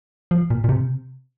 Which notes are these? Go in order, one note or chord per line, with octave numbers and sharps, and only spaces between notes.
F3
A#2
A#2
C3